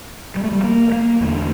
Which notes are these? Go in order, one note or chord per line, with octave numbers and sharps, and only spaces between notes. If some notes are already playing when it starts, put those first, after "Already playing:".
G3
A3
G3
A#3
A#3
E2 D3 A3